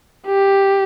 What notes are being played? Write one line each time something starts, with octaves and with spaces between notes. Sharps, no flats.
G4